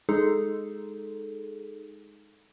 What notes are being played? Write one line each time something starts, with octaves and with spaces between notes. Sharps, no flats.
G#3 D#4 G#4 A4